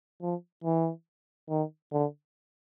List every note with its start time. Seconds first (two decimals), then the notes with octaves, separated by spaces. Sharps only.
0.22 F3
0.64 E3
1.49 D#3
1.92 D3